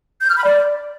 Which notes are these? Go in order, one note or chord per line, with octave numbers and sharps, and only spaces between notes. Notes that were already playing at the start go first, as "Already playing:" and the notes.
G6
F6
B5
D5